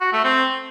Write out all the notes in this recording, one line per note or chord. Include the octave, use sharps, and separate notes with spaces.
F#4
A3
C4